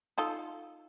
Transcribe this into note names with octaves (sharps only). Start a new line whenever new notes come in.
D#4 F4 A4